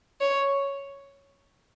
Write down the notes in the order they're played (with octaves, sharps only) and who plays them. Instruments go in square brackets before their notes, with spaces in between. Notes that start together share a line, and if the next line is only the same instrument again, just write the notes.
[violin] C#5